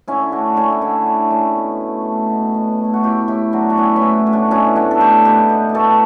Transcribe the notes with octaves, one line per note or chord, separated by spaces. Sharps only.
D3 C#4 E4
A3 D4 F#4
A3 C#4 E4
D4
D3 C#4 E4
D3 D4
A3 C#4 E4
B2
A3
A3
B2
B2
A3
E4
F#4
A2 E4 G4
A2 E4 G4
F#3 D4 F#4
F#4
B3 C#4 E4
C#4 E4
A2
A2
D4 F#4
B2 C#4 E4
A3 D4 F#4
A4
A3 E4 G4
B2 G4 B4
B2
G4
A3 F#4 A4